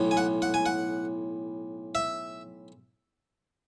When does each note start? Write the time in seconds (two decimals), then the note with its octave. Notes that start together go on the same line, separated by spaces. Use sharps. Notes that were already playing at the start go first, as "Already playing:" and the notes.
Already playing: B1 A2 E3 B3
0.11 G#5
0.17 F#5
0.42 F#5
0.54 G#5
0.66 F#5
1.95 E5